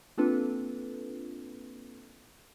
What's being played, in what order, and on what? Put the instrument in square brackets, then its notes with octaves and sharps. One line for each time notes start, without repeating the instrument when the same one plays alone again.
[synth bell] A#3 C4 D4 F4 A4 B4